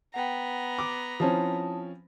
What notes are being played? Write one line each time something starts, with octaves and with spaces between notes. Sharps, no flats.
B3 F#5 G5 A#5
D6
F3 C4 C#4 E4 A5 D#6